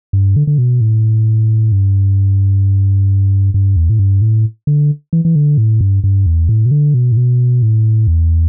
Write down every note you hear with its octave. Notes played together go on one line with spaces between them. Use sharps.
G2
D3
D3
B2
A2
G2
G2
E2
A2
G2
A2
D3
E3
E3
D3
A2
G2
G2
E2
A2
B2
D3
B2
A2
B2
A2
E2